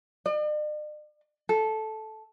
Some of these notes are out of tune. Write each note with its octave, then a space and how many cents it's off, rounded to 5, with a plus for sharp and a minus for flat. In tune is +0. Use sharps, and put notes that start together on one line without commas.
D5 +45
A4 -10